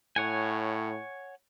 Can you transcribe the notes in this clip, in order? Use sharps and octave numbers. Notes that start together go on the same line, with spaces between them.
A2 C#5 F#5 G#5